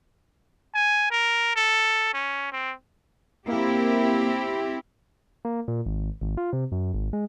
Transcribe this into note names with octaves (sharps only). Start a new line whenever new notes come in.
G#5
A#4
A4
C#4
C4
A#3 C4 E4 G4
A#3
A#2
G#1
G#1
F4
C3
F#2
G#1
G#3